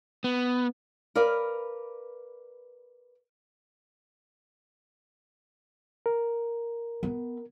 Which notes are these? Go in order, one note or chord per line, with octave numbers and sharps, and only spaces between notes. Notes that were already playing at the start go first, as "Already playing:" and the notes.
B3
A#4 B4 D5 F5
A#4
B3